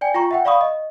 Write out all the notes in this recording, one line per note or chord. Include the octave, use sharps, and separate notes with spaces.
D5 G5 G#5
F4 G5 A#5 C#6
E5 F#5 G5
D5 F5 B5 C#6 D#6
D#5